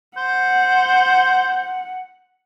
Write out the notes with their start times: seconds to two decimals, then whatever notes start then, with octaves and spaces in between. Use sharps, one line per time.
0.17 C5 F#5